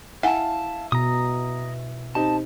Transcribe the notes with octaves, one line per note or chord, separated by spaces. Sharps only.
E4 F5 F#5 G#5 A5
B2 A#5 D#6
C4 D#4 G4 A5